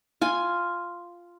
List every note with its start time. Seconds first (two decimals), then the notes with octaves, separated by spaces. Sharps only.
0.21 F4 G#5